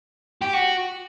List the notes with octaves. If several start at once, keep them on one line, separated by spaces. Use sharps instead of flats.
G4
F#4